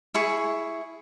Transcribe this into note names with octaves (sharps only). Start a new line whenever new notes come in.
E4 G#4 C#6